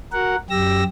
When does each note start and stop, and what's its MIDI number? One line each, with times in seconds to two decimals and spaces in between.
0.13 0.36 66
0.13 0.36 70
0.13 0.36 78
0.50 0.84 42
0.50 0.84 67
0.50 0.84 88
0.50 0.84 94